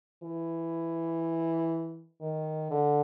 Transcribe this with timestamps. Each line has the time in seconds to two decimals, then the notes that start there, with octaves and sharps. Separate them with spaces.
0.23 E3
2.22 D#3
2.71 D3